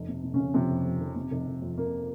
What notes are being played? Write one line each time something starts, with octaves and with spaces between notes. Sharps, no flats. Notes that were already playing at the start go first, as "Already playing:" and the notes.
Already playing: F1
C3
C3
C#3 C#4
F1
F2 C3 C4
F1
F2
F1
C3
F1
F1
F2
C3 A#3